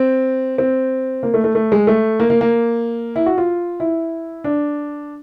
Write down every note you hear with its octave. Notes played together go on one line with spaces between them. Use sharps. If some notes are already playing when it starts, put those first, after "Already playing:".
Already playing: C4
C4
A#3
A3
A3
A3
G#3
A3
A#3
A#3
A#3
E4
F#4
F4
E4
D4